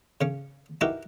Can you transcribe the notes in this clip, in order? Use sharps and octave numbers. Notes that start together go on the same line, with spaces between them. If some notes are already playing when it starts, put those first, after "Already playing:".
C#3 C#4
D#4 E4 F#4 G4 A#4 B4